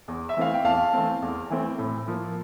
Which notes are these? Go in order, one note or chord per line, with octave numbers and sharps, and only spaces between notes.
E2
E5
E3 A3 C4 F5
G5
E2 F5 A5
E3 A3 C4
E2
E3 A3 C4
A2
F3 A#3